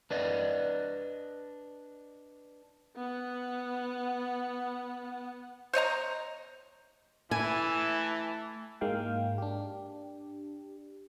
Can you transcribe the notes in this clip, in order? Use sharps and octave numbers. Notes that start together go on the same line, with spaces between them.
D4 B4 D5 D#5
B3 F#5
C5 C#5 D#5 A#5
E3 A3 E4 G#5 A5
G#2 G#3 A#3 F5 G5
D4 G4